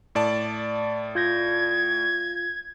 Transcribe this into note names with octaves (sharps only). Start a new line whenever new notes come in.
A2 D5 A5
F4 G6 G#6 A#6